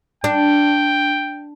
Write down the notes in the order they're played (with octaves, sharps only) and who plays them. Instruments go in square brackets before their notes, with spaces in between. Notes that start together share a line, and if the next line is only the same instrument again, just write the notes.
[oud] D4 [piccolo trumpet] G5